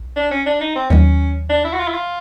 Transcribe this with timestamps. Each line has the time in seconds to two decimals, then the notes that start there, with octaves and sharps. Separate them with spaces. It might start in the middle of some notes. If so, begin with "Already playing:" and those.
Already playing: B1
0.17 D4
0.31 C#4
0.46 D4
0.61 D#4
0.76 C4
0.90 D#2 D#3 F#3 C#4
1.50 D4
1.64 E4
1.73 F#4
1.80 F4
1.88 E4
1.94 F4